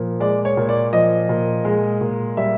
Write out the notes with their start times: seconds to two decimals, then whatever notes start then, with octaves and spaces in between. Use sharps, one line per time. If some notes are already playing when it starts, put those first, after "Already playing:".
Already playing: A#2 F3
0.20 G#3 D5
0.45 C#5
0.57 A#2
0.69 D5
0.93 F3 D#5
1.29 A#2
1.65 G#3
2.01 A#2
2.37 G3 E5